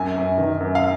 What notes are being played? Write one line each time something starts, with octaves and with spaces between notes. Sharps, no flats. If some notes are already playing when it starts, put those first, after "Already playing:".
Already playing: F#2 G#5
F#2
D#3
F#2
F5